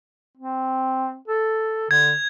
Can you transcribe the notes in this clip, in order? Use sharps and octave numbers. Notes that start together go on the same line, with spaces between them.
C4
A4
D3 G#6